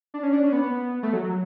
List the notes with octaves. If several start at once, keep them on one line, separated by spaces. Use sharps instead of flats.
D4
C#4
D4
C#4
B3
B3
A3
F#3
F#3